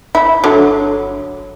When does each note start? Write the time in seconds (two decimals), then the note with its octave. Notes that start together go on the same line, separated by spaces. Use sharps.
0.15 G1 E4
0.44 D3 F#3